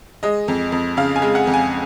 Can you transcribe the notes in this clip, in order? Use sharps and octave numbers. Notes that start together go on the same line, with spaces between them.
G#3 D#5
F2
F2
C#3 F5
G#5
G#3
F#5
F2
G#5